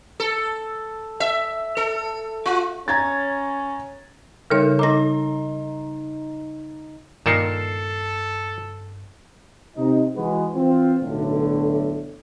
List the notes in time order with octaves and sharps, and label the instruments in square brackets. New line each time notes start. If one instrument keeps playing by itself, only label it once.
[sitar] A4
E5
A4
F4
[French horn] C#4 [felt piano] A#5 G#6 A6
[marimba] C#3 G3 C#5 [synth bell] D#4 A4 A#4
[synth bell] D#4 D#5 A#5 [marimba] D6 A#6
[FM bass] G2 [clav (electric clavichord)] A#2 D#3 A#4 [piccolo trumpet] A4 [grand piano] C7 C#7 E7
[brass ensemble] C3 D#4
E3 G#3 F#4 B4
E3 C4 F4
B1 A2 D3